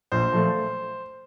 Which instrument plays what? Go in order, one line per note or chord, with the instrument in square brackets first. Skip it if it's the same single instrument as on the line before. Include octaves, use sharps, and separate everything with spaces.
[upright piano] A#1 [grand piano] C5
[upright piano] A#2 F3 A3